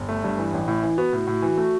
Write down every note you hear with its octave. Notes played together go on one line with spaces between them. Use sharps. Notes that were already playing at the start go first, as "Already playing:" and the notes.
Already playing: G1
A3
G2
E3
A1
A2 E4
E3
B3 F#4
A2
A2
E3
A3